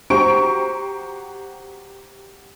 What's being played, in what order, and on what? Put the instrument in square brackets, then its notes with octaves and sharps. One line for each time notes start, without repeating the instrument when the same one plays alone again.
[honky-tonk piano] F#4 G4 C5 A#5 C#6 D7